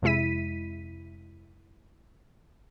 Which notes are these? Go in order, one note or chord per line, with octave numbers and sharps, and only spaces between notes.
F2 C3 G#3 E4 B6 D#7